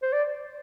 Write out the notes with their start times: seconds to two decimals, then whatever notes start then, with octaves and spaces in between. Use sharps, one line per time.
0.03 C5
0.13 D5